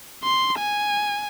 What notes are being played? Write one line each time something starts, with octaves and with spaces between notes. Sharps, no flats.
C6
G#5